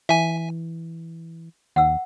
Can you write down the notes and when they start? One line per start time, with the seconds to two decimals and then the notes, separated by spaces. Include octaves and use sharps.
0.09 E3 E5 G#5
1.76 D#2 F#5 E6